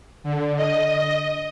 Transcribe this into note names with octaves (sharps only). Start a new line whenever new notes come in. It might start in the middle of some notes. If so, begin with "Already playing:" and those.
D3
D#5